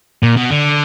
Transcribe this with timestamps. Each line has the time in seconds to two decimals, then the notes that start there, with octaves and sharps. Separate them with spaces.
0.23 A#2
0.37 B2
0.50 D3